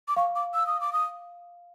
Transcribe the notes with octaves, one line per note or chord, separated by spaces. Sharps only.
D6
F5 C#6
D6
E6
D#6
D6
D#6